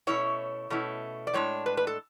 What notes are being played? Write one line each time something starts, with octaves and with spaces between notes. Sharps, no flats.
B2 A3 C#4 E4 C#5
B2 A3 C#4 E4
D5
A2 G#3 D4 C#5
B4
B4
A4